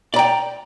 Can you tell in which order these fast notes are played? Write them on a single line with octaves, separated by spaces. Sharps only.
D5 A#5 G5